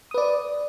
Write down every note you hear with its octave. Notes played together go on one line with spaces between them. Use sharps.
B4 D5 D#6